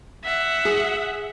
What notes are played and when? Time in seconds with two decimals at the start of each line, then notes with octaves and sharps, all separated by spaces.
0.24 E5 F#5
0.65 G#4